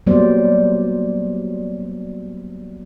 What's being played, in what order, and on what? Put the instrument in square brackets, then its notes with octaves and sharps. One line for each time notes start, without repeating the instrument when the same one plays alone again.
[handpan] F#3 G3 A#3 B3 C5 D5